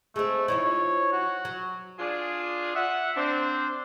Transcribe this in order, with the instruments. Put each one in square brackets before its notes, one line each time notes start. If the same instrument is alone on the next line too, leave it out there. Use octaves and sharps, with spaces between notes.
[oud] G#3 C4 [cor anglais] A3
[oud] F3 D#4 E4 [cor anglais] C#5
[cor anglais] F#4
[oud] F#3
[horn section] D4 F4 G#4
E5 F#5
C4 D4 C5